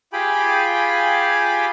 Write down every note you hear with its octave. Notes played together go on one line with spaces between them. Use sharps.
F4 G4 G#4 G5 G#5 B5